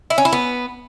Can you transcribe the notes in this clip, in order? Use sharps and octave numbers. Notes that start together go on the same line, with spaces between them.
E4
C#4
E4
B3